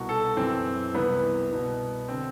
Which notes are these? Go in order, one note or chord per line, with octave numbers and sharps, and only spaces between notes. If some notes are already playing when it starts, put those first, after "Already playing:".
Already playing: C2 B2 F#4
A4
F#2 E3 C4
C2 C3 E3 B3
C2 B2
D3 C4